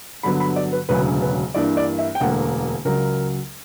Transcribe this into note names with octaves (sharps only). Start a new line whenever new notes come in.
G2 D3 F#3 B3 B5
B5
D5
B4
E1 D2 C#3 F#3 B4
B4
G2 E3 A#3 D5
D5
E5
G5
E1 D2 D3 A#3 F#5
C#2 C#3 F#3 A#4